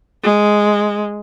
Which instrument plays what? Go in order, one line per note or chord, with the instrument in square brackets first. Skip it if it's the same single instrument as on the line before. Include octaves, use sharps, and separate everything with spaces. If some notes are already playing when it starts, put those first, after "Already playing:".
[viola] G#3